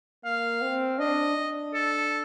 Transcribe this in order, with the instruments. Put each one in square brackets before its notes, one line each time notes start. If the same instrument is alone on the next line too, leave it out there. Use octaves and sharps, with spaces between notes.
[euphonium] A#3 [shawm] F5
[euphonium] C4
[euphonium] D4 [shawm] D#5
[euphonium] D4
[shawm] A4